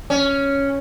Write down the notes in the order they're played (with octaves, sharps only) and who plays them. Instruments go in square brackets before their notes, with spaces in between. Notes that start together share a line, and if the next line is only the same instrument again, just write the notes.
[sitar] C#4